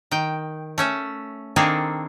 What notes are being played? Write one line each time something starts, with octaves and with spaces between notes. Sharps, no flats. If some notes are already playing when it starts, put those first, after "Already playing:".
D#3 G5
A3 C#4 E5
D#3 A#3 C4 D4 G#4 A4